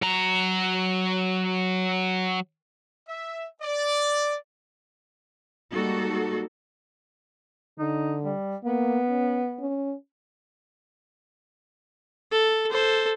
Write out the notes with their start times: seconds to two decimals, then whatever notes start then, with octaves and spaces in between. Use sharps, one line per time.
0.02 F#3 A#5
3.09 E5
3.62 D5
5.73 G3 G#3 A#3 D#4 F#4 A4
7.79 D3 D#4
8.24 G3
8.64 A#3 B3
9.09 C#4
9.60 C#4
12.32 A4
12.71 A4 C5